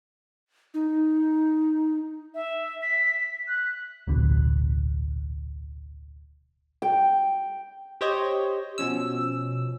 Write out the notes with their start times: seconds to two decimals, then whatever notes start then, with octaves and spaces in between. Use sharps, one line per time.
0.74 D#4
2.34 E5
2.82 B6
3.48 F#6
4.07 D1 A#1 B2 D3
6.82 G5
8.01 G4 C5 C#5 D#5
8.78 B2 F3 C#4 E6